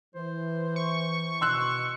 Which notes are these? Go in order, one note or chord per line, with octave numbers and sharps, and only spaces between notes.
E3 C5
C#6
B2 C6 E6 F#6